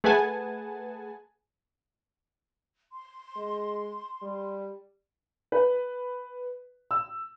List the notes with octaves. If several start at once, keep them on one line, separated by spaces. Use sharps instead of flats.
A3 G#4 B4 F#5 G#5 A5
C6
G#3
G3
B4
E6